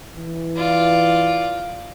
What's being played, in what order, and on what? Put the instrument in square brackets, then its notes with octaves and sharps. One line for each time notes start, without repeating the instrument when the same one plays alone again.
[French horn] E3
[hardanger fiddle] F4 D5